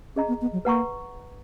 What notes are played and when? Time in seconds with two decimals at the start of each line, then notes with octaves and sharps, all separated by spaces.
0.16 C#4 G#4 D#5 A#5
0.28 B3
0.41 B3
0.53 F#3
0.65 A#3 B4 F#5 A#5 C#6